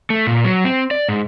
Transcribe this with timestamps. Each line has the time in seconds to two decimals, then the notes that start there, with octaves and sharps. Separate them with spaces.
0.10 A3
0.27 A#2
0.45 F#3
0.65 C4
0.91 D5
1.09 G#2